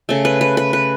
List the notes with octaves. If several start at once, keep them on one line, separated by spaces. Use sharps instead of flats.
C#3 A3
B4
B4
B4
B4